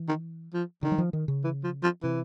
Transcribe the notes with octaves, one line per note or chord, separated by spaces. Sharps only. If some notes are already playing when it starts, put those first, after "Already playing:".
Already playing: E3
D#3
F3
D3 D#3
F#3
F3
D#3
C#3
E3
F3
F3
C3 E3